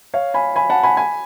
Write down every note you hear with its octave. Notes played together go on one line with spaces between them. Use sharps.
C#5 F5
G#5 B5
G#5 B5
F#5 A5
G#5 B5
G#5 B5